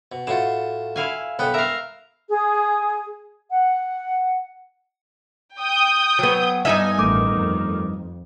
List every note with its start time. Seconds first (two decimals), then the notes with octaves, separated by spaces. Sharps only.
0.12 B2
0.27 A2 F4 F#4 A5
0.96 E4 F5 G#5
1.39 B1 B3 G5
1.54 A#4 E5 F5
2.31 G#4
3.51 F#5
5.59 G5 D#6 G6
6.19 F#3 B3
6.65 G2 B3 D#4 E5 G#5
6.98 A1 D#3 A3 B3 D6
7.37 F2